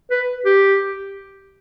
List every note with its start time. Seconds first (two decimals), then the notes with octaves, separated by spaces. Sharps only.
0.11 B4
0.45 G4